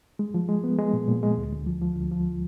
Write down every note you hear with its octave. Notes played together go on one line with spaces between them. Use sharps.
G#3
F3
G#3
B3
G#3
A#2
A#2
G#3
D2
D2
F3
F3
D2
F3